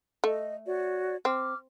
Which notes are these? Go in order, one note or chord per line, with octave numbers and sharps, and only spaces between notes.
A3 D#5
F#4 C#5 D5
C4 D6 F6